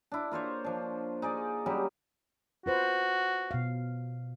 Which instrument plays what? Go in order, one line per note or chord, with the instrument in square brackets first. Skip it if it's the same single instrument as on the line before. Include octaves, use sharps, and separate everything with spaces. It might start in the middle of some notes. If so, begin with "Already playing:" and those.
[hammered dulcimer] D4 E4
A#3 F4 C5 C#5
F3 D4
D#4 G#4 D5
F#3 G3 C#4 D#4
[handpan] F4 B4 C5 [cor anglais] F#4
[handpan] B2 F5